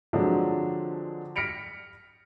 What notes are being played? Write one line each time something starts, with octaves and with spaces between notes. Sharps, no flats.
D3 F3 F#3 G#3 C4 D4
F6 A#6 B6 C#7 D7 F7